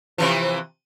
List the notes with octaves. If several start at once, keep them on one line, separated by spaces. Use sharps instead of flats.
C3 E3 F3